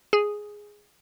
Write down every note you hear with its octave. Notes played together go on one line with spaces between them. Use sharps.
G#4